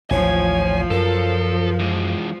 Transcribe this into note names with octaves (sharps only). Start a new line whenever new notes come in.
A1 D#2 F3 C#5 G#5
F#2 A4 A#4
E3 G#3